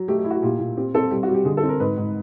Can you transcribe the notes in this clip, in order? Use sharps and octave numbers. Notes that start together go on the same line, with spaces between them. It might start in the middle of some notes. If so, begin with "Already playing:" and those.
Already playing: F#3
A3 G4
G4
E4
F#4
A#2 G4
A#2
C4 G4
C4 A4
G3 G4
F#4
G3
G4
D3 G#4
A4
C4
A#4
G#2 B4
G#2